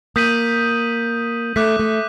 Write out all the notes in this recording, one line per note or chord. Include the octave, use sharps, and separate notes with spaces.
A#3 D#6 G6 B6 D#7 F#7
A3 D6 F#6 B6
A3